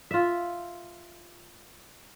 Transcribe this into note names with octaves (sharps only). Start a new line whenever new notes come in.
F4 E5